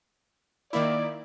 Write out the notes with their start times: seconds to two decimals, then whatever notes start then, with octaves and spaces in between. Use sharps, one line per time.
0.73 D#3 A#3 E4 D5